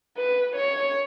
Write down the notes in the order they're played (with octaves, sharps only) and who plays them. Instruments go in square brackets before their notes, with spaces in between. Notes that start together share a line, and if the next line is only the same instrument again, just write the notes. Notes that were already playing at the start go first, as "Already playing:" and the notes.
[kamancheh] B4
C#5